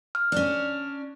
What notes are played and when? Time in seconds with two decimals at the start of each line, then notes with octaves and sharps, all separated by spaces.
0.15 F6
0.32 C#4 D4